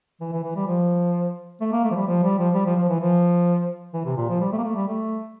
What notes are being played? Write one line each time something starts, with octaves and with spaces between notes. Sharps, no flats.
E3
E3
E3
G3
F3
A3
A#3
A3
F3
G3
F3
G3
F3
G3
F3
F3
E3
F3
E3
C3
A#2
F3
G3
A3
A#3
A3
G3
A3